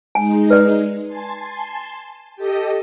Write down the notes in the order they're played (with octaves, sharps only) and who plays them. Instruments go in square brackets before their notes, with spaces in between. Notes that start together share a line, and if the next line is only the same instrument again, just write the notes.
[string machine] G#3 D#4 [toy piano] G#5
[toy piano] B4 D5
[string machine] G#5 A5 C6
G4 A4 D#5